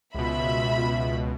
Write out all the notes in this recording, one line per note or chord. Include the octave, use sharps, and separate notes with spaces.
C#2 B2 F4 E5 B5